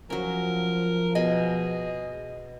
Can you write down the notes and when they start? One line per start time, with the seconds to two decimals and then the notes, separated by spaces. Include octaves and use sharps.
0.10 F3 F#3 C#4 A#4
1.15 B2 G#4 D#5 G#5